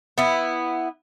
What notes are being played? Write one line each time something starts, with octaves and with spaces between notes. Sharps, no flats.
B3 E4